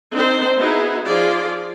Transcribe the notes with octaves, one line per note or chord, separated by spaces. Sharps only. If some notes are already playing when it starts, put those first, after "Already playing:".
C4 D4 D#4 C5
B3 D#4 E4 F#4 G#4
F3 F4 G#4 D5